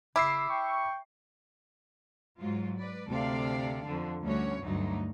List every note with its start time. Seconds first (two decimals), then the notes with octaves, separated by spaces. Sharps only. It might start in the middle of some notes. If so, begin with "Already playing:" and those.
0.16 C#3 E4 D6 E6 C7
0.48 G5 C#6
2.39 G#2 F#3 F4
2.78 B4 D5
3.08 D2 C3 A4 D5 F5
3.84 F2 D3
4.22 D2 G3 A3 C#4 F#4 C#5
4.63 D2 G2 F#3 A3 D#4